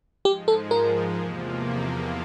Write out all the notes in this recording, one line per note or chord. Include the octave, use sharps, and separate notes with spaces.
G#2 F3 G#3 G4
A4
A#4
E2 C3 F3 A#3